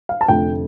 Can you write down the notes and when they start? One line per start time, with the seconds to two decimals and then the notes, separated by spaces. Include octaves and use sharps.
0.09 F5
0.21 A5
0.28 F1 F2 D3 A3 G5